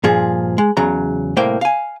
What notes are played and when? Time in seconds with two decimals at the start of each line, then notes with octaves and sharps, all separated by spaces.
0.04 G2 A#2 F3 G#4
0.58 G#3
0.77 E2 C#3 F#3 A#5
1.36 C2 A2 A#3 C5 G5
1.61 F5 G#5